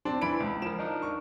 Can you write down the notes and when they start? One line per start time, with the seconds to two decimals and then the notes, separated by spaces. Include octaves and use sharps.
0.05 C4 D4
0.21 E3 B5 D7
0.40 C#2
0.62 F3 A#4 E7
0.79 D4 D#4 A#4
1.02 C#6